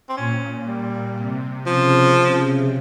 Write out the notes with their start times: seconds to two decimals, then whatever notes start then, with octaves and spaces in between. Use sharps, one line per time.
0.09 C4
0.17 A#2 C#4
0.67 G3
1.16 C3
1.66 C#3 F3